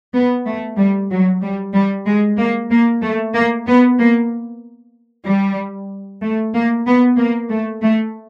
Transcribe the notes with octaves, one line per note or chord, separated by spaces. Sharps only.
B3
A3
G3
F#3
G3
G3
G#3
A#3
A#3
A3
A#3
B3
A#3
G3
A3
A#3
B3
A#3
A3
A3